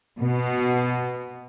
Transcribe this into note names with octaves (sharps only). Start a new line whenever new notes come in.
B2